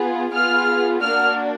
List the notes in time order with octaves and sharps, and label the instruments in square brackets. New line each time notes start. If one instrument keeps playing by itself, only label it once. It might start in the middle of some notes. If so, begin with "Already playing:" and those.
Already playing: [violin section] B3 F4 G#4
B3 F4 G#4 F6
A#3 D4 F#4 F6